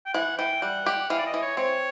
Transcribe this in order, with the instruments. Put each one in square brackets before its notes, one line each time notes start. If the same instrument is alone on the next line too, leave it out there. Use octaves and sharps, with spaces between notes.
[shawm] G5
[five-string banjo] E3 [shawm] F#5
[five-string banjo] E3 [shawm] G5
[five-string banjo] G3 [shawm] F#5
[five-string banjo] G4
[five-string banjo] E3 [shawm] F5
[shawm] D5
D#5
[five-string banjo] E3
[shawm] C#5
[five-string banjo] C4 [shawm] C#5